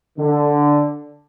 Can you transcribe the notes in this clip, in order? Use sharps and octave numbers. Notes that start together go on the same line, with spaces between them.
D3